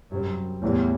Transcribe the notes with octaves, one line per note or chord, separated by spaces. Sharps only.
F#2 C3 G3 C4
E2 A2 E3 G3